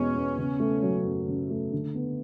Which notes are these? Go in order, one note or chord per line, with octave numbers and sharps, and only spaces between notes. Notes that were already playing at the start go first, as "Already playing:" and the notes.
Already playing: E2 B2 G#3 B3 C#4
B3
C#3
A3
F#3
F#2
C#3
A3
D3
B3